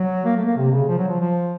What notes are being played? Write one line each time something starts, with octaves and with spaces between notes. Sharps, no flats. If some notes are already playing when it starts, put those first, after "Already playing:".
Already playing: F#3
A#3
A3
A#3
C3
C#3
F3
F#3
F3
F3